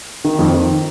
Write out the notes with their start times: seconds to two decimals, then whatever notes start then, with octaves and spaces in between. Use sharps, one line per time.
0.24 D#3
0.39 F2
0.54 D#3